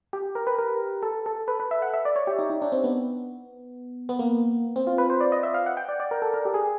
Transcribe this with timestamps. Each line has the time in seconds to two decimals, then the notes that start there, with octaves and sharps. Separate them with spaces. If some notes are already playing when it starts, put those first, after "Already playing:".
0.13 G4
0.35 A#4
0.47 B4
0.59 A#4
1.02 A4
1.26 A4
1.48 B4
1.60 B4
1.71 E5
1.82 F#5
1.94 E5
2.05 D5
2.16 C#5
2.27 G4
2.39 D#4
2.50 D#4
2.62 D4
2.72 C4
2.84 B3
4.09 B3
4.19 A#3
4.76 C4
4.87 F4
4.98 B4
5.10 C5
5.21 D5
5.32 D#5
5.43 E5
5.54 F5
5.66 F#5
5.77 G5
5.89 D5
6.00 D5
6.11 A#4
6.22 A4
6.34 A#4
6.45 G4
6.54 G#4